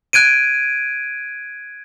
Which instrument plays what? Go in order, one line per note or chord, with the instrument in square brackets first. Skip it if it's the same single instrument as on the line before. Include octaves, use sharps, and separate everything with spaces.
[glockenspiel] F#6 G#6 D7 D#7